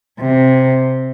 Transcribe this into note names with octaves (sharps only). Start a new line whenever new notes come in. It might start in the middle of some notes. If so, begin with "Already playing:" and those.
C3